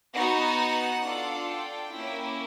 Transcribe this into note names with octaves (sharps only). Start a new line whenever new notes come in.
B3 D#4 F#4 F#5
D4 F4 A4
G5
A#3 C#4 E4